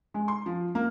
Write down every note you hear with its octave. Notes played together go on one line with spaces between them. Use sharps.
G#3
C6
F3
A#3